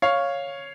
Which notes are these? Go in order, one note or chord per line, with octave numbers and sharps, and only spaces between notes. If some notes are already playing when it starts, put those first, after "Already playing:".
C#5 F5